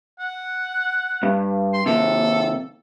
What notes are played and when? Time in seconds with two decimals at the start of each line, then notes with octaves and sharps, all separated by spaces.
0.19 F#5
1.23 G2
1.73 C6
1.86 D#2 C3 A4